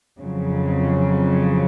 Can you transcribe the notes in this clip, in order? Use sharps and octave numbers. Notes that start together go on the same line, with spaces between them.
F2 C#3 F#3